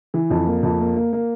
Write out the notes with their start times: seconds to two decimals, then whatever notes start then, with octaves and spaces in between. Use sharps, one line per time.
0.14 E3
0.30 F2
0.47 A#3
0.63 F2
0.80 A#3
0.96 A#3
1.13 A#3